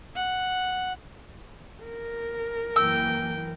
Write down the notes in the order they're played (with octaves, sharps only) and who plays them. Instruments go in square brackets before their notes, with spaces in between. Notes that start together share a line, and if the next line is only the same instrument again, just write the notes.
[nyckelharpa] F#5
[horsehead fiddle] A#4
[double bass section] F#2 E3 A#3 [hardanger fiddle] G5 [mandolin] E6